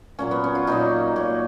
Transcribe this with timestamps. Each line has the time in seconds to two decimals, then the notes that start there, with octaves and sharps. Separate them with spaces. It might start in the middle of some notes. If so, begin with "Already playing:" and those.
0.19 A#2 F#3 A#3 C#4
0.31 B3
0.44 C#4
0.55 F4
0.67 A#2 F#3 A#3 D#4
1.16 A#2 F#3 A#3